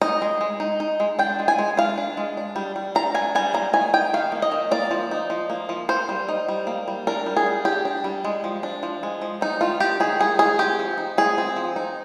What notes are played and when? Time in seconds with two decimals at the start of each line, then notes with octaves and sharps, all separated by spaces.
0.01 D#4 D#5
0.22 G#3
0.41 G#3
0.60 D#4
0.80 D#4
1.00 G#3
1.19 D4 G5
1.39 G#3
1.48 G#5
1.59 G#3
1.77 D4 F5
1.98 D4
2.17 G#3
2.37 D4
2.56 G3
2.76 G3
2.95 D4 A#5
3.14 D4 G#5
3.35 G3 G#5
3.54 A#3 A#5
3.73 D#3 G#5
3.94 D#4 G5
4.13 D#3 F5
4.32 A#3
4.42 D#5
4.51 D#3
4.71 A#3 D5
4.91 F3
5.11 D#4
5.30 F3
5.50 A#3
5.69 F3
5.89 A#3 C5
6.09 G3
6.29 D#4
6.49 G3
6.67 A#3
6.88 G3
7.07 D4 A#4
7.26 G3
7.37 G#4
7.46 G3
7.65 D4 G4
7.85 D4
8.04 G3
8.25 G#3
8.44 F3
8.63 D4
8.83 F3
9.03 G#3
9.22 F3
9.41 G3 D#4
9.61 D#3 F4
9.80 D4 G4
10.00 D#3 G#4
10.19 G3 G#4
10.39 D#3 G#4
10.59 C4 G4
10.79 F3
10.98 D#4
11.18 F3 G#4
11.38 C4
11.56 F3
11.76 D#4